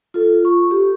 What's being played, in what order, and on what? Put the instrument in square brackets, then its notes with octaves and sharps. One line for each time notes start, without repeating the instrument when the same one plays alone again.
[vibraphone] F4 A4
C#6
G4